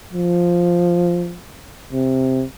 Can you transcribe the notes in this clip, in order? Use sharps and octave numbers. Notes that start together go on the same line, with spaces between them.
F3
C3